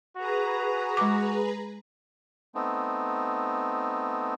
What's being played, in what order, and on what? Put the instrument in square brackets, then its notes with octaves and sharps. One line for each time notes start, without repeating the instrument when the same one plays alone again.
[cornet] F#4 [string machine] G#4 B4 A#5
[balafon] G#3 D6
[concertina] A3 B3 C4 D#4